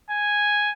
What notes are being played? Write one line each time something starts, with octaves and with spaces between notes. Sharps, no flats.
G#5